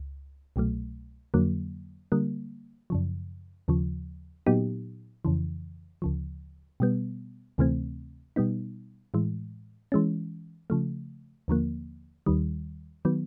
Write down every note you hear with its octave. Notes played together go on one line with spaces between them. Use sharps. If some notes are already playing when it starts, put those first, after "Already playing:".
Already playing: C#2
C2 B2 F#3 A3
F2 D3 F#3 A#3
D3 G3 A#3
F#2 C#3 F3
D#2 C#3 F3
A#2 F#3 B3 D#4 G4
F2 C#3 E3
D2 C#3 F3
B2 G3 B3
D2 C3 E3 A3 C4
B2 G3 B3 D#4
A2 E3 G#3
E3 G#3 C#4
C#3 F3 A3
D#2 D3 F3 A#3
D#2 D#3 G3
D#3 F#3 B3